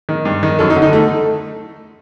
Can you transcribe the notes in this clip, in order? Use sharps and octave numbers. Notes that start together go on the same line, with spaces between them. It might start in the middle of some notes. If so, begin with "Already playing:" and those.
D#3
G2
D#3
F#2 A4
D#4
D3
D#4
A3